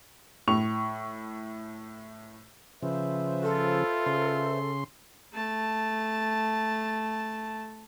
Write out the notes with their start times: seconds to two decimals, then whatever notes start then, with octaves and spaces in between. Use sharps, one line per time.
0.48 A2 C#6 F7
2.83 C#3 F3 B4 C5 E5
3.43 F4 A4
4.06 C#3 C6
5.33 A3 A5